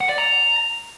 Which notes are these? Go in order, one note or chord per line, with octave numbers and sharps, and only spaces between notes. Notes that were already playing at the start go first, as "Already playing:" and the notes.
F#5
D5
A#5